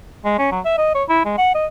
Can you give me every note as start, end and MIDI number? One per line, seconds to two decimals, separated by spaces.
0.25 0.35 56
0.39 0.49 61
0.52 0.60 54
0.65 0.77 76
0.78 0.91 75
0.95 1.04 73
1.09 1.21 64
1.25 1.37 56
1.38 1.53 78
1.55 1.66 75